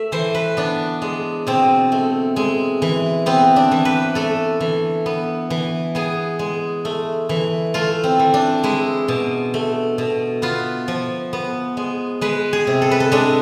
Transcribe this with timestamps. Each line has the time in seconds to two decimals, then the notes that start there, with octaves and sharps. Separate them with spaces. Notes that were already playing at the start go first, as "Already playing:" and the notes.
Already playing: A3 E5
0.12 E3 C5
0.34 B4
0.57 B3 D4
1.02 G#3
1.47 B2 C4
1.92 A3
2.36 G#3
2.82 E3
3.26 B3 C4
3.56 D4
3.71 E3
3.85 B4
4.15 A3 A4
4.61 E3
5.06 B3
5.50 E3
5.95 B3 G#4
6.39 G#3
6.85 A3
7.29 E3
7.74 A3 F4
8.04 C4
8.19 E3
8.34 D4
8.63 G#3 E4
9.08 B2
9.54 A3
9.98 B2
10.42 B3 F4
10.88 F3
11.33 B3
11.77 G#3
12.21 G#3 B4
12.53 G#4
12.67 C3
12.82 A4
12.91 B4
13.00 A4
13.12 G#3 D4